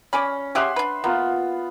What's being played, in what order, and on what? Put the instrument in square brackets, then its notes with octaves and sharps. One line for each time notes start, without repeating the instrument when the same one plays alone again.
[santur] C#4 [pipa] D5 G#5 B5
[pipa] C#4 G4 G#4 [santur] E5 F#5 C6
[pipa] D4 B4
[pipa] A#3 [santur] B3 F4